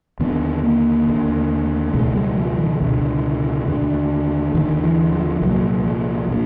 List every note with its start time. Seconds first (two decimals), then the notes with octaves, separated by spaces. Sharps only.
0.20 D#2 D3 B3
0.63 A#3
1.07 D#2 D3
1.94 C#2 B2 A3
2.15 G3
2.37 F3
2.59 D#3
2.81 C#2 B2 D3
3.67 D#2 D3
4.54 D#2 D3 D#3
4.84 E3
5.13 F3
5.42 C2 A#2 F#3
5.85 F3
6.29 A#2 F3